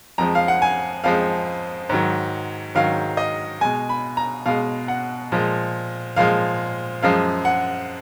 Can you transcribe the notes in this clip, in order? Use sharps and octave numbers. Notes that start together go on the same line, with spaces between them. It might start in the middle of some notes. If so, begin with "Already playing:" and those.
F2 F3 G#3 A#5
F5
F#5
G#5
F2 F3 G#3 F5
G#2 D#3 F#3
G#2 D#3 F#3 F5
D#5
B2 G#3 G#5
B5
A#5
B2 G#3 F5
F#5
A#2 F3 G#3
A#2 F3 G#3 F5
F#2 F3 G#3 F5
F#5